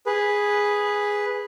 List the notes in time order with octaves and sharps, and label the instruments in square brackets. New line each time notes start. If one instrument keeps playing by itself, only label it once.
[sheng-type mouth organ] G#4 B4